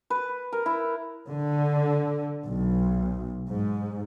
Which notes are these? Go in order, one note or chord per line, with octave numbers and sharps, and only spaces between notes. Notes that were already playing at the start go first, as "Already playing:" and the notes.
B4
A#4
E4
D3
B1
G#2